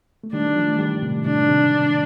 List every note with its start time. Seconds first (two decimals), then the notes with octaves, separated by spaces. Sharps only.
0.24 A3
0.33 D#3 G3 D4
0.56 F3 A3
0.79 D#3 G3
1.02 A2 C3
1.25 A2 C3 D4
1.48 C3 D#3